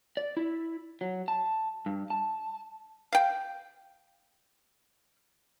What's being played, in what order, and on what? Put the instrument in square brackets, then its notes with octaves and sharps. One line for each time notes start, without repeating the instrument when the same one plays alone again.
[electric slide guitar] D5
E4
F#3
A5
G2
A5
[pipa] F5 G5